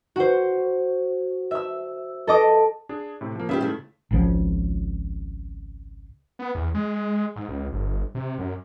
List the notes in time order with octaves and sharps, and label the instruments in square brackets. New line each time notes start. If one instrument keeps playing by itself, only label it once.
[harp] F#4 C5
E5 E6
A4 D#5 D6
[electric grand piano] D4 G#4
A2 C3 C4
F3 A#3
[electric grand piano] G#2 C#3 [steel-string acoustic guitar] G4 B4 E5
[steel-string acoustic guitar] A3 E4
[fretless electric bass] G#1 C#2 C#3 F3
[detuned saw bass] B3
E2
G#3
G#2
C#2
G1
C3
F#2